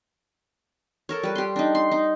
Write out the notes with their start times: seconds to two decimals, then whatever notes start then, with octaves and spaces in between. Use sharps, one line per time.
1.09 A4 A#4 C#5
1.23 G3 B4
1.35 G4 C6
1.56 D4 D#4
1.75 C6
1.92 D#4